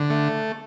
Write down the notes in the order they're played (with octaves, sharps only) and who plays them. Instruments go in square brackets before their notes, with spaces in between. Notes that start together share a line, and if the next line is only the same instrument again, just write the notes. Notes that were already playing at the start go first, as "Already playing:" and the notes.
Already playing: [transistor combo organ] D3
A3